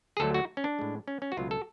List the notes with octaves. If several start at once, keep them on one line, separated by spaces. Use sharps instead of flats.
G#4
D2 D3 F#3 A3 A4
F#4
C#4
D4
A2 G#3
C#4
C#4
F#4
C#2 B2 F#3 A3 F4
A4